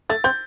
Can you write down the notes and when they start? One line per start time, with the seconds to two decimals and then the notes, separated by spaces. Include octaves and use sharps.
0.10 A3 A6
0.24 C4 G6